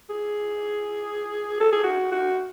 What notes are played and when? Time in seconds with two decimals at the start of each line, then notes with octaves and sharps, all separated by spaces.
0.10 G#4
1.60 A4
1.72 G#4
1.84 F#4
2.12 F#4